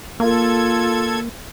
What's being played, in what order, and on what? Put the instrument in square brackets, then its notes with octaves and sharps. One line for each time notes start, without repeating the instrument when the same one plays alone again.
[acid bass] A#3 [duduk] F4 [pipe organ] A4 G#6